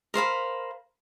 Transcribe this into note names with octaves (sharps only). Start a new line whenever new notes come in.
A#4 C5 F5 B5